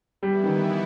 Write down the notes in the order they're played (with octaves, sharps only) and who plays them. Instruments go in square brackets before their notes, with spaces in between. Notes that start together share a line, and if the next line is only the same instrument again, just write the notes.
[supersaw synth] E3 B3 E4 [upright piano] G3
[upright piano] D#3